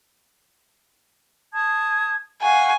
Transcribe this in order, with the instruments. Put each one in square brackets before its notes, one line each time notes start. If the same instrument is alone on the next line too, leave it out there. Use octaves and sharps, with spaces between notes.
[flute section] A5 D#6 G#6
[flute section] F5 F#5 C#6 [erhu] G#5